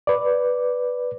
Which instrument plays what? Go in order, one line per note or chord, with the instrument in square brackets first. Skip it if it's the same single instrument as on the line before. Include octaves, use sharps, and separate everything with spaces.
[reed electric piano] B4 D5